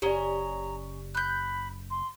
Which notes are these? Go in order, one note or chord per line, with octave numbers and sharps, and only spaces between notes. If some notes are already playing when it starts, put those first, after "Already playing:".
F#1 C#4 G4 D5 D#5 G#5 A#5
B5 F#6 G6
C6